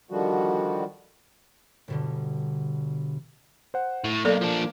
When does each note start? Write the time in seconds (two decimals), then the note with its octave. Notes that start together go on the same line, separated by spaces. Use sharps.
0.11 D3 D#3 F3 G3 F#4
1.88 G1 B2 D3
3.74 C5 F#5
4.04 A2
4.25 B1 A#3 A4 D5
4.42 F3 D4